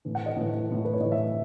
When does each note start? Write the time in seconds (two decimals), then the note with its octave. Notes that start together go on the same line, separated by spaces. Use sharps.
0.05 A2 E3
0.15 F#5
0.26 D#5
0.36 A2 E3
0.69 A2 E3
0.85 B4
0.93 C#5
1.00 A2 E3 D#5
1.12 E5